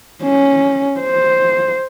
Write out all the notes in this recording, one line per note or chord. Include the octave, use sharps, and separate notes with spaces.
C#4
C5